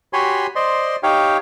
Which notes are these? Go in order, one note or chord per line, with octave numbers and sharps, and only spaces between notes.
F#4 G4 C#5 G#5 B5 C6
C5 D5 D#5 C6
D#4 G4 C#5 F5 G5